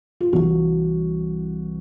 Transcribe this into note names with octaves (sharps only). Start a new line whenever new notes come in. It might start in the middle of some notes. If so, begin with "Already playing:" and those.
F4
C2 C3 E3 F#4